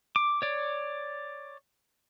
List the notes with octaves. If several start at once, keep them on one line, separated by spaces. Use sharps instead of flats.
D6
C#5 D5